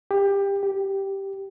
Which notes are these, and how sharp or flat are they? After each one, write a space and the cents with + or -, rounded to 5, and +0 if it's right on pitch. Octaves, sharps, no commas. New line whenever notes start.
G4 +20
G4 -5